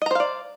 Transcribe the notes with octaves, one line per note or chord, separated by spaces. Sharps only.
C5 D5 D#5 F5 A#5